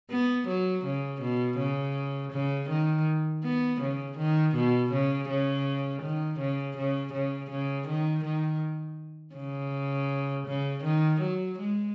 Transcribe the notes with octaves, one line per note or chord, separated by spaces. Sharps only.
B3
F#3
C#3
B2
C#3
C#3
D#3
B3
C#3
D#3
B2
C#3
C#3
D#3
C#3
C#3
C#3
C#3
D#3
D#3
C#3
C#3
D#3
F#3
G#3